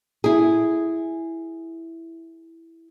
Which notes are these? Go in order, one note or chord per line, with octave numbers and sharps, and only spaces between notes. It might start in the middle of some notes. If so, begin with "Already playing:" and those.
E4 G#4